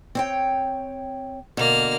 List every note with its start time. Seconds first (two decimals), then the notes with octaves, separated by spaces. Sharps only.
0.15 C4 C#5 G5
1.57 B2 D3 A#3 F6